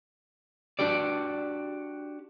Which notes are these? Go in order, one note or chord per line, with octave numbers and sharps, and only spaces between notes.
D4 F#4 G4 D5